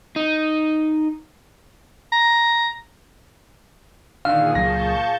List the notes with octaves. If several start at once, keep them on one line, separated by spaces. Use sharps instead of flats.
D#4
A#5
A#2 D3 D#3 G#4 F5
C#2 F#3 A5 C#6 G6 A#6